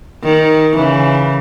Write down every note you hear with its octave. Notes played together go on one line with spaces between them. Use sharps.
D#3
C#3 E3